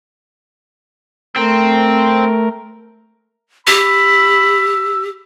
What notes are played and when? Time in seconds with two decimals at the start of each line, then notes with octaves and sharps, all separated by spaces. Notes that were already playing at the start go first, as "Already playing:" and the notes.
1.36 A3 C4 A#4
3.67 G4 B5 E6